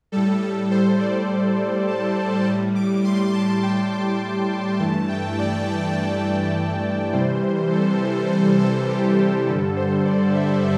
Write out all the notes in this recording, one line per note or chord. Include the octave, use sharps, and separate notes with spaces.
A2 G3 A4
A4
C5
D5
A5
A2 G3
D6
C6
A5
G5
D6
D6
C6
G2 E3 A3 A5
G5
D5
C3 E3 G3 C5
A4
C5
A4
G4
G4
G2 D3 G3 A4
C5
D5
E5